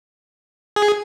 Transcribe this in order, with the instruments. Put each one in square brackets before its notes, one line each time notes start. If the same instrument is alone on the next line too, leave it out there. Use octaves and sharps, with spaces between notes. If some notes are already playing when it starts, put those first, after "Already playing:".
[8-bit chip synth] G#4